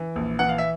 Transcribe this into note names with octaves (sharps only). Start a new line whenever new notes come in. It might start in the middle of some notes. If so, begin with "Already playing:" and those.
Already playing: E3
A#1
E3 F#5
F5
E5